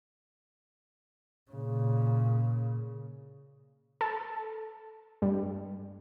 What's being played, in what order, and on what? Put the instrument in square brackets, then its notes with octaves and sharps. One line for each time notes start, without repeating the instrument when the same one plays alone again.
[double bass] A#2 C#3
[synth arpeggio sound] A4
G2